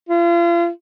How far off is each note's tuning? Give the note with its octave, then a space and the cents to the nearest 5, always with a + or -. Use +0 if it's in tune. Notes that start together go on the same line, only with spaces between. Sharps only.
F4 -40